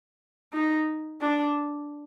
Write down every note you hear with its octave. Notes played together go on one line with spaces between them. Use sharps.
D#4
D4